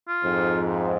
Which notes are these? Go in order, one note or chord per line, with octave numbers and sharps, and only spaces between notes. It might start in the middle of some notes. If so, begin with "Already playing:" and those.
F4
F2 G#2